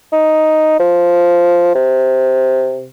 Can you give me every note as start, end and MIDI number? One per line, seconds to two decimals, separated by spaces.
0.13 0.79 63
0.80 1.72 53
1.75 2.88 48